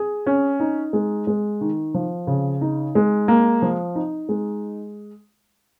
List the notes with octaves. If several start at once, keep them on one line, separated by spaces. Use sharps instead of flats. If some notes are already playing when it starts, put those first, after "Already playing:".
Already playing: G#4
C#4
D#4
G#3
G#3
D#3
F3
C#3
D#4
G#3
A#3
F3
D#4
G#3